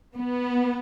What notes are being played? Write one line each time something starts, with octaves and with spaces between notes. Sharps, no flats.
B3